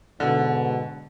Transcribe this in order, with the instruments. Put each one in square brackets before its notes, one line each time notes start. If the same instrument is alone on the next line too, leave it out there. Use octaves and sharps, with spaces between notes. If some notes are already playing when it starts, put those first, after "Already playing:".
[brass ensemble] G#2 B2 [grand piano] D3